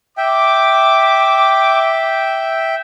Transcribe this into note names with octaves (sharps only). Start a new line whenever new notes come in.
E5 G5 D6